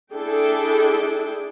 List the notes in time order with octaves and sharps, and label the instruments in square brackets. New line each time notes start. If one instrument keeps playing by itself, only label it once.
[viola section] D4 E4 G#4 A4 G5